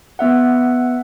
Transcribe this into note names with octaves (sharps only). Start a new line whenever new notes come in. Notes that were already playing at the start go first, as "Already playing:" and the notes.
B3 E5 F#5